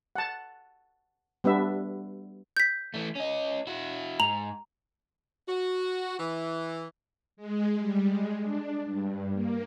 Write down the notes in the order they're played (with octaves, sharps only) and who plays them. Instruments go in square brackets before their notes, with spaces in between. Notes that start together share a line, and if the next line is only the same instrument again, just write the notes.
[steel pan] F#5 A5
G3 B3 D4 E5
[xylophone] G6 B6
[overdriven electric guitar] E3 A3
C#4 D#5
E4 F#4
[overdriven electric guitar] G#2 [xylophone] A#5 F7 F#7
[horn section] F#4
E3
[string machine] G#3
G3
G#3
D4
G2
A#3